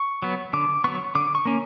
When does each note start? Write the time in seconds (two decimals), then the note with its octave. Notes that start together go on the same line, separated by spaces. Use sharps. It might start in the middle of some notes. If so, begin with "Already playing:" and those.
Already playing: C#6
0.22 F#3 B3
0.53 D3 D6
0.84 F#3 B3 C#6
1.15 D3 D6
1.35 C#6
1.45 A#3 C#4